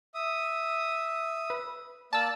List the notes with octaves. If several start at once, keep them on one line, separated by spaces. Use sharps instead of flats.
E5 D#6
B4
A#3 D5 A5 D6 E6